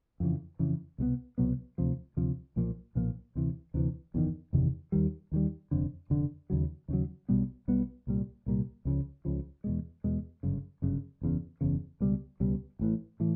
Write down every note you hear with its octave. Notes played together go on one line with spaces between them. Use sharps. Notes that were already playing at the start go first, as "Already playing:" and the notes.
F2 C#3 E3
F2 C#3 E3
C2 B2 F#3 B3
C2 B2 F#3 B3
D2 C3 F3
D2 C3 F3
B1 A#2 F3 A#3
B1 A#2 F3 A#3
D2 C3 E3
D2 C3 E3
F#1 E2 C3 D#3
F#1 E2 C3 D#3
D#2 D#3 G3
D#2 D#3 G3
F1 F2 D3
F1 F2 D3
D#2 C#3 F#3
D#2 C#3 F#3
B1 B2 G3 B3
B1 B2 G3 B3
C2 A#2 G3
C2 A#2 G3
C#2 C#3 F3
C#2 C#3 F3
E2 B2 G#3
E2 B2 G#3
G1 F#2 C#3
G1 F#2 C#3
F#1 E2 C#3
F#1 E2 C#3
C#2 B2 G3
C#2 B2 G3
A1 A2 E3
A2 E3